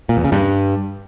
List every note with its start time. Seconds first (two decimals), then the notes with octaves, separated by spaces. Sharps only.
0.09 A#2
0.17 E2
0.25 C#3
0.32 G2